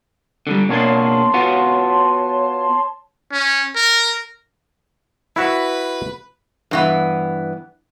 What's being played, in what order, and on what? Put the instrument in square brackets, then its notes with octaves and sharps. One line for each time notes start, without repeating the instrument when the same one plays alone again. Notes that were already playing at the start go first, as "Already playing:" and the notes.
[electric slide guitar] D3 F3 G3
[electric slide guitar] B2 A#3 D4 [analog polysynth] C#5 A5 C6
[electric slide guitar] B3 F4 F#4
[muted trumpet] C#4
A#4
[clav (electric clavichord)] E4 F#4 E5 [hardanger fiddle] B4
[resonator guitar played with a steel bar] G2 E3 B3